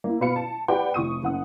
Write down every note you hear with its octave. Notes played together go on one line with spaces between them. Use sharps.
A#3 E4
B2 F#4 B4 F5 C#7
A5
G4 B4 D5 F#5 G5
F1 C#6 D#6 D#7
F#1 F#5 D#6